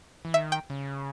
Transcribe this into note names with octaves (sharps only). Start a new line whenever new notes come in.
E3
D#3 E5
G5
C#3